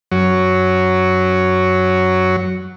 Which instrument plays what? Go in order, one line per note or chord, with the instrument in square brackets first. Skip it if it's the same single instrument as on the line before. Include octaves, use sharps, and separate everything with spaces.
[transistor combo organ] F#2 F#3 C#5